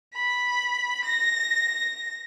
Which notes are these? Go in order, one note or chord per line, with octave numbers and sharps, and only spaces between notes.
B5
A#6